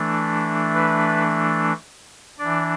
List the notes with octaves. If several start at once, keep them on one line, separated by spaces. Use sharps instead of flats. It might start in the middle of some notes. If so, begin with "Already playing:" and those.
Already playing: E3 A3 D4
B4
E3 D4 D5